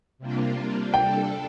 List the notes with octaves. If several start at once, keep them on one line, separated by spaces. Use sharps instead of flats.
C3 G3 A#3 D4 F4
G3 D4 A4 G5